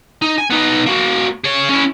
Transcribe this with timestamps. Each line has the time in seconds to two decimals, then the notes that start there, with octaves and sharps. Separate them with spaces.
0.22 D#4
0.38 G#5
0.51 B3 D#4
0.86 A#3 F#4
1.44 G#4 C#5
1.69 C#4 E4